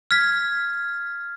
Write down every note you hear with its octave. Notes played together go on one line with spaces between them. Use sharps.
F6 G#6 B6